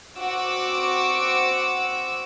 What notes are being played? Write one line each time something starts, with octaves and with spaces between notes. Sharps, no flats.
C4 F#4 D6 E6